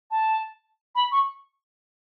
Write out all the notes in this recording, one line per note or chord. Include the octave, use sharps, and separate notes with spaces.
A5
B5
C#6